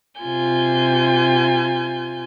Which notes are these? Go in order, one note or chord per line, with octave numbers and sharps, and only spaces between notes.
C3 F4 G#5 G6